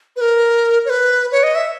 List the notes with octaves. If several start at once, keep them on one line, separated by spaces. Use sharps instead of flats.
B4
A#4
C#5
B4
C#5
D#5
E5